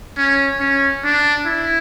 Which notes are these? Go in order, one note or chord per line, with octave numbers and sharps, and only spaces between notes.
C#4
C#4
D4
E4